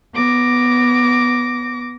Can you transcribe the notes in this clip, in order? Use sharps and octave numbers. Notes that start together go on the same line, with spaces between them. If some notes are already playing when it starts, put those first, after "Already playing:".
B3 D6 A#6